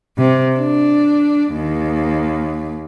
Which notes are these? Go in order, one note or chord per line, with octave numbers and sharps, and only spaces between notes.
C3
D4
D#2